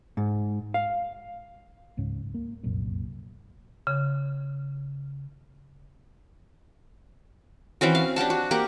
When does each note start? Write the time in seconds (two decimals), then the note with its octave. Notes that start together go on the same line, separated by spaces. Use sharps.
0.17 G#2
0.74 F5
1.97 D1 C#2 G#2 C#4
2.34 A#3
2.63 F1 C2 F#2 A#2
3.87 C#3
7.81 E3 C4 C#4 F#4
7.95 F5
8.16 D4 G4 F#5 A5
8.30 F#4
8.51 A#3 G4 F#5